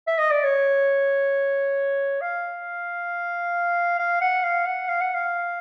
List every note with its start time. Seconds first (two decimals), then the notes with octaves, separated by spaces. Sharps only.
0.07 E5
0.19 D#5
0.31 D5
0.44 C#5
2.21 F5
3.99 F5
4.21 F#5
4.43 F5
4.66 F#5
4.88 F5
5.01 F#5
5.14 F5